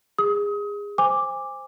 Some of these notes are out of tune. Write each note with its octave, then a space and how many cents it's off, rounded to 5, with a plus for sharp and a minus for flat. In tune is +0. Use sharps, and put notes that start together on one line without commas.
G#4 -25 D#6 +30
C5 +0 G#5 -30 D6 +0